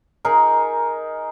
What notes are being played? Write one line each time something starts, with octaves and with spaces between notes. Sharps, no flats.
D#4 G#4 A#4